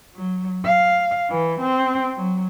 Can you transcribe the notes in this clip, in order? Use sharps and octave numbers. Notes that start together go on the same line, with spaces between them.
F#3
F5
E3
C4
F#3